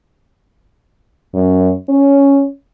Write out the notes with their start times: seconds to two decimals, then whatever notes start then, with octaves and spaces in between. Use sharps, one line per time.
1.34 F#2
1.89 C#4